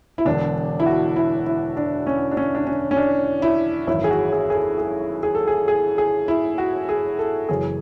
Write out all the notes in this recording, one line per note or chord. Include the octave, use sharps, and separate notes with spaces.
E4
E1 E2 D3 D4
E4
F#4
E4
E4
D4
C#4
D4
C#4
D4
C#4
C#4
D4
E4
G#1 F#2 E3 E4
G#4
F#4
G#4
G#4
A4
G#4
G#4
A4
G#4
G#4
G#4
E4
F#4
G#4
A4
F#1 F#2 E3 G#4